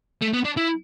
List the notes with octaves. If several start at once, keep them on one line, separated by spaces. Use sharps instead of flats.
A3
B3
D4
E4